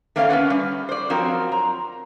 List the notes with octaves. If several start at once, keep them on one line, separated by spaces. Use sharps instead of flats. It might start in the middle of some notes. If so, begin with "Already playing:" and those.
A3 A#3 C4 C#4 B4 F5
C#4 D4 B4 F#5
G3
C5 D5
F3 F#3 C4 F4 A#4
A#5